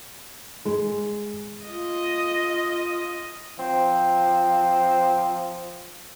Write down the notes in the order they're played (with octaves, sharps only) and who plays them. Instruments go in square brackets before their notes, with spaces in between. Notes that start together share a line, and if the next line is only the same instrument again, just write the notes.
[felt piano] G#3
[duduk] F4 [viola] D#5
[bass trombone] F3 [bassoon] C4